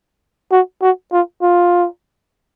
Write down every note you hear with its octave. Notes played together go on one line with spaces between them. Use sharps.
F#4
F#4
F4
F4